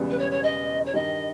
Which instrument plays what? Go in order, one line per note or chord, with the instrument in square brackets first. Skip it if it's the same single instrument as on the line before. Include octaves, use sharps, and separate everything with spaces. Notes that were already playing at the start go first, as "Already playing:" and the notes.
Already playing: [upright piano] E1 E2 C#3 G3 B3
[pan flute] B4
C#5
C#5
D#5
C#5
[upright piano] G2 D#3 G3 [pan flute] D#5